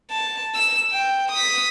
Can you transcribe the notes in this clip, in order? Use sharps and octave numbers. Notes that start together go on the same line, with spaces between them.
A5
E6 E7
G5
D#6 B6